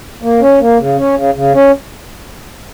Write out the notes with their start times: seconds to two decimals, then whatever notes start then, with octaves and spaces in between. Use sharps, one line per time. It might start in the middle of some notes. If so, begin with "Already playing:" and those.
0.22 A#3
0.41 C#4
0.60 A#3
0.79 C#3
0.97 C#4
1.16 C#3
1.34 C#3
1.53 C#4